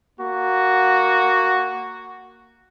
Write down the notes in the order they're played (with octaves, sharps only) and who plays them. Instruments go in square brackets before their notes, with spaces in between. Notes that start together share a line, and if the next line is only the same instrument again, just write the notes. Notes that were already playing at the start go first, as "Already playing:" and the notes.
[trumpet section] A#3 F#4